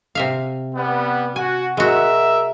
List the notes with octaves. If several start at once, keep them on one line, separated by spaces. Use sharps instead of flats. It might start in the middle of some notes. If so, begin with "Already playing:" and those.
C3 E5 F5
G3 B3
F#4 G#5
G#3 F#4 A#4 E5